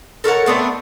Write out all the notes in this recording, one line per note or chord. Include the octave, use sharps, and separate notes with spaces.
A4 A#4 C#5 F#5
A3 B3 C4 D4